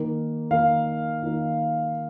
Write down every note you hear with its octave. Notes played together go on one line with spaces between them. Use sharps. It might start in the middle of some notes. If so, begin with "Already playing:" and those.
Already playing: D#3 A#3 D#4
D#3 A#3 D#4 F5
D#3 A#3 D#4